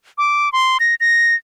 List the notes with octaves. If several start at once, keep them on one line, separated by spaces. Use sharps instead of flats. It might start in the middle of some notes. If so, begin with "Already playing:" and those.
D6
C6
A#6
A#6